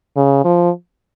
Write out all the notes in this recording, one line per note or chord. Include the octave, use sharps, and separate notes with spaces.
C#3
F3